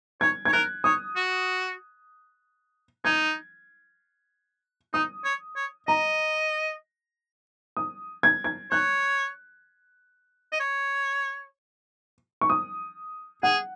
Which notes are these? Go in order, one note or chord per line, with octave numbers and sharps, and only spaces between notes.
C#5 G#6
C#5 G#6
A#4 F#6
C#5 D#6
F#4
D#4 G#6
D#4 D#6
C#5
C#5
D#5 A#5
D#6
G#6
G#6
C#5 F#6
D#5
C#5
C#6
D#6
G#4 F#5